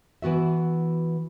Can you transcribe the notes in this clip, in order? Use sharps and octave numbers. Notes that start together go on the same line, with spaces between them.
E3 B3 F#4 E5